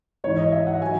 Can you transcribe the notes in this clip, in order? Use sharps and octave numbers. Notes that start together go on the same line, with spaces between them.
G#2 E3 C#5
D#5
E5
F#5
D#3 F#3 G#5